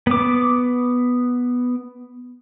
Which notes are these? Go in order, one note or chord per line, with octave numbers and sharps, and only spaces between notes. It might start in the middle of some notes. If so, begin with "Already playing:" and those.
B3 D6